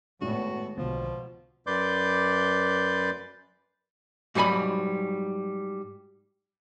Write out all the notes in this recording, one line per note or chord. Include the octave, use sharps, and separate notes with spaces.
G#1 A2 B3 F#4
B1 B2 D3 F3 B3
F#2 B4 D5 C6 D6 G6
G#2 F#3 G3 D#4 G#5 B5